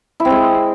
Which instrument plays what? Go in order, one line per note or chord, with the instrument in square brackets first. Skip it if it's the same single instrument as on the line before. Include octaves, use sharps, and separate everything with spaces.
[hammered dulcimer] E4
C4
G#3